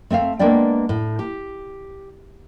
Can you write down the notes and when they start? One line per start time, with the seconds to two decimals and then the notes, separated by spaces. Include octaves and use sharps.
0.10 A3 C4 E5 F5
0.39 G#3 A#3 B3 D4 D5 G5
0.89 A2
1.19 G4